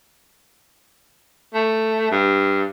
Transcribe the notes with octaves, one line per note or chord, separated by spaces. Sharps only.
A3
G2